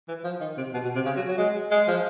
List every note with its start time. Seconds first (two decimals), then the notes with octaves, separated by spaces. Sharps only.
0.08 E3
0.24 F3
0.41 D#3
0.58 C3
0.74 B2
0.84 B2
0.95 C3
1.06 C#3
1.17 F#3
1.28 F#3
1.38 G#3
1.71 G#3
1.88 F3